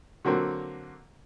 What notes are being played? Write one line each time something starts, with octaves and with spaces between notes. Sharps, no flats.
D3 F#3 A#3 C4